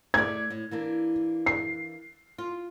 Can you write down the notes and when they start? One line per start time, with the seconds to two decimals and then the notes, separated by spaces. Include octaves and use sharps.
0.14 A3 E4 D5 G#6
0.50 A2
0.71 E3 A#3 D4
1.46 C7
2.38 F4